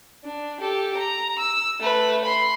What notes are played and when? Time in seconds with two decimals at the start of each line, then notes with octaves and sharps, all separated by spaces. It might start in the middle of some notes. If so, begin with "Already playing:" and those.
0.24 D4
0.61 G4 A4
0.97 A#5
1.39 E6
1.80 A3 B4
2.25 B5 C6